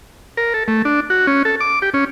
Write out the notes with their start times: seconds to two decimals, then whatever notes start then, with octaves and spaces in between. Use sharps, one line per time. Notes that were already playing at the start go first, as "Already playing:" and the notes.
0.37 A#4
0.54 A4
0.68 A3
0.85 D4
1.10 F#4
1.27 C#4
1.45 A4
1.61 D6
1.82 G4
1.94 C#4